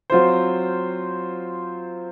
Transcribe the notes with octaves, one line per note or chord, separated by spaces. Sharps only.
F#3 C4 F4 C5